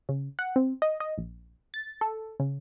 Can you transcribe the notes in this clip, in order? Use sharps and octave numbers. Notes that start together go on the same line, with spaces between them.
C#3
F#5
C4
D#5
D#5
A#1
A6
A4
C#3